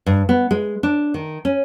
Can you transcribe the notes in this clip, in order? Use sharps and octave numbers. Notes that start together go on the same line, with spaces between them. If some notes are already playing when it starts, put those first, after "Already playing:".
G2
B3
G#3
D4
D#3
C#4